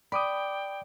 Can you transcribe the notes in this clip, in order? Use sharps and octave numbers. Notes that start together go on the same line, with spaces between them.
D5 G5 B5 D6 D#6